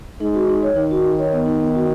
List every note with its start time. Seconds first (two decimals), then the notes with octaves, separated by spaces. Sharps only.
0.20 G#3 D#4
0.34 F#4
0.49 D#4
0.63 C#5
0.76 D#3 D#4
0.91 F#4
1.05 D#4
1.19 C#5
1.32 B3
1.46 D#4
1.60 B3
1.75 F#4